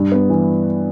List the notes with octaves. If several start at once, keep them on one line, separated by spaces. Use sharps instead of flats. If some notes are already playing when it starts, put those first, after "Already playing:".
Already playing: G2
B3
E3